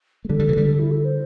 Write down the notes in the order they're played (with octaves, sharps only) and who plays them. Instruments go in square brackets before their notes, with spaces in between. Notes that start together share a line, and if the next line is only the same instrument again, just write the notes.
[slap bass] A3
[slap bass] D3 G3 [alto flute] A4
[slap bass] D3 G3
C3 E3
D3 G3
[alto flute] A4
E4
A4
C5